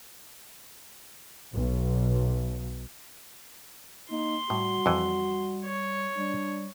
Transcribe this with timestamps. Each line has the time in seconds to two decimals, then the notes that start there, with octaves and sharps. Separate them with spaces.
1.54 B1
4.10 A#3 D#4 C6
4.50 A2 G3 F#4
4.86 F2 E3
5.65 C#5
6.17 G3 D4